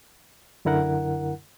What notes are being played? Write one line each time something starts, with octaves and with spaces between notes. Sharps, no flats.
F#2 D3 E4 A#4 F#5